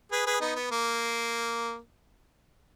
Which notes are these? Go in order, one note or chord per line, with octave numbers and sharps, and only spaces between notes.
G#4 B4
G#4 B4
B3 D#4
B3
A#3